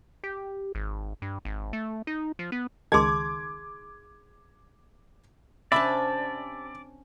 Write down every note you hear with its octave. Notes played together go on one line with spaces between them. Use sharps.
G4
G#1
G2
G#1
A3
D#4
F3
B3
C#2 D#3 D#4 G#4 C6 D6 G#6
C3 C#4 D4 D5 E5 A5 B5